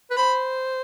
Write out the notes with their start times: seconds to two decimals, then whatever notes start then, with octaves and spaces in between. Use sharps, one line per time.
0.11 B4
0.17 C5 B5